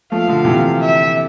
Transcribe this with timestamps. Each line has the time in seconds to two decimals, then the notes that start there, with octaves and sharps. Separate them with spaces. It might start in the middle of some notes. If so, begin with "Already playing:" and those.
0.11 F3 A3 F5
0.28 D3 F3
0.45 C3 E3
0.80 E5